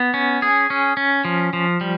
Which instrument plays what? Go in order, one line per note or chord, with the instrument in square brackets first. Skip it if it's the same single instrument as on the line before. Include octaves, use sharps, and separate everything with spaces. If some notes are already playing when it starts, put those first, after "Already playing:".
Already playing: [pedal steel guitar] B3
C#4
G#4
C#4
C#4
F3
F3
G3